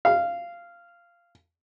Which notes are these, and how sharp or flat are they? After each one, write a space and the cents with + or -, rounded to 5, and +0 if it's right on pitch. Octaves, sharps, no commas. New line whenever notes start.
F5 -15